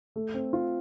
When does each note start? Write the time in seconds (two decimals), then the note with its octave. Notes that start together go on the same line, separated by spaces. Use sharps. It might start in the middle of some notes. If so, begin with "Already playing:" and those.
0.16 A3
0.34 C4
0.53 F4